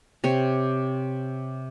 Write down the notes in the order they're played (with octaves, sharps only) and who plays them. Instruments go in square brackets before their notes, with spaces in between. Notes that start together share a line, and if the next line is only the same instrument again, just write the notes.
[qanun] C3 C#5